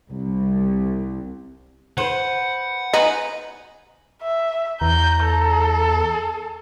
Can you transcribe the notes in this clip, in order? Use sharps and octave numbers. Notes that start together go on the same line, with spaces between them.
C2
B4 C5 F#5
D#4 B4 G#5
E5
E2 A#5 G6
A4